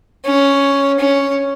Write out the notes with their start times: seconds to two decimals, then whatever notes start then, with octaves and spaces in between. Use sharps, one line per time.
0.25 C#4
0.99 C#4